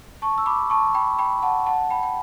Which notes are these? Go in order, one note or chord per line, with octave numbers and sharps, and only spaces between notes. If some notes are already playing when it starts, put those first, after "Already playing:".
A5 C#6
E6
B5 D6
A5 C#6
G5 B5
G5 B5
F#5 A5
F#5 A5
G5 B5
G5